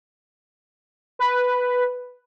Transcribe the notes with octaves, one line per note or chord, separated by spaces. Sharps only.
B4